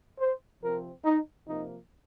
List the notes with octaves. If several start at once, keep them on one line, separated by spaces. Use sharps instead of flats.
C5
C3 F3 C4 A#4
D#4
C3 F3 A#3 D#4